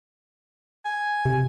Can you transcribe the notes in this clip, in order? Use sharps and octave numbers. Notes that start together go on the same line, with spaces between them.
G#5
C3